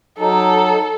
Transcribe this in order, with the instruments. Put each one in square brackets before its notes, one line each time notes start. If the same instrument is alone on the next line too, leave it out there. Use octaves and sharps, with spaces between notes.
[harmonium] F#3 D#4 [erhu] A4